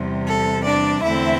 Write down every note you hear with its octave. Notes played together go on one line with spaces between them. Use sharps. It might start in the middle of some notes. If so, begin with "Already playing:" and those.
Already playing: E2 C3 G3
A4
D4 D5
E2 D3 A3 C4 E4 E5